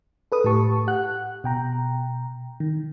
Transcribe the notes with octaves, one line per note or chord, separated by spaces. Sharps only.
A4 B4 D#6
A2 A3 G4 A5 C#6
G4 F#5 F#6
B2 G5 A#5
D#3